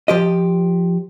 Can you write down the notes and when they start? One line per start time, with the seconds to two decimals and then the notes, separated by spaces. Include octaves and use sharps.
0.08 F3 G4 D#5